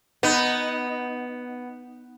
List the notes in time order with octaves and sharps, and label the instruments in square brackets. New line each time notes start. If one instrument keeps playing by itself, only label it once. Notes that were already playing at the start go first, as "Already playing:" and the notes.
[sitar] B3 [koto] D#4